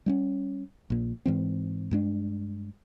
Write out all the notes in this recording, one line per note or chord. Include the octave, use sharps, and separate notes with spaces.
G3 C4 C#4
A#1 A#2
G#2 E3 C4
G2 G#3 D4